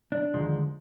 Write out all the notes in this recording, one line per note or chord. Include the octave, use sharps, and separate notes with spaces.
D4
D#2 D3 F3 G#3